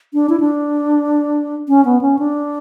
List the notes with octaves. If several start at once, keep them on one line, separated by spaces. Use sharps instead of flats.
D4
E4
D4
C#4
B3
C#4
D4